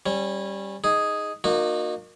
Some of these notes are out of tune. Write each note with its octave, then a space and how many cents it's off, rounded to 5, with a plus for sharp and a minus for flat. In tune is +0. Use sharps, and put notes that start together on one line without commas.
G3 +0 C#4 -25
D#4 +0 G#4 +0
A#3 +0 D#4 -30 F#4 -30